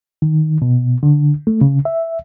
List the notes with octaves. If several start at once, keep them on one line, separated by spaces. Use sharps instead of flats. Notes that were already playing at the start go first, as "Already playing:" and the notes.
D#3
B2
D3
A3
C#3
E5